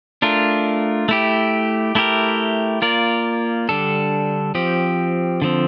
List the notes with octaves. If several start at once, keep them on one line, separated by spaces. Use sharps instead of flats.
A3 D4 F4 A#4
A3 E4 G4
A3 E4 G4 A#4
A#3 F4 A#4 D5
D3 G3 D4 A4
F3 C4 G4
D3 F3 C4